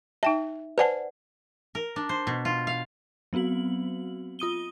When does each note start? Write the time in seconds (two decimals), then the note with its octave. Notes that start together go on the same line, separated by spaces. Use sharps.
0.23 D#4 E5 G5 A5
0.78 B4 C5 D5 F#5 G#5 A5
1.75 A#4
1.96 D4
2.09 C5
2.27 B2
2.45 F4
2.67 F5
3.33 F#3 B3 C4 F#4 F#7
4.39 F4 D#6 D#7 G7